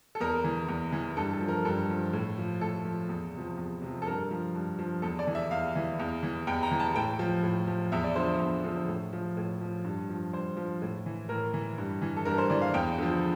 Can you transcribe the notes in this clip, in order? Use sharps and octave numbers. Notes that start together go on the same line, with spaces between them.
A4
E2 A#4
E3
E2
E3
G2 A4
A4
F3
A#4
G2 A4
F3
A2
F3
A2 A4
F3
E2
C3 F3
E2
C3 F3
A4
G2 A#4
F3
G2
F3
E2 A4
D5
E3
E5
E2 F5
E3
E2
E3
E2 G5
A#5
E3
A5
A2 G5
F3
A2
F3
E2 E5
D5
D3 F3 C5
E2
D3 F3
A2
F3
A2
F3
G2
F3
G2 C5
F3
A2
E3
A2 A#4
E3
G2
E3
A4
G2 A#4
C5
E3 D5
F5
E2 G5
D3 F3